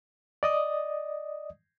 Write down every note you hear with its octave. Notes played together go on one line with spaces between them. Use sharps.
D5 D#5 D#6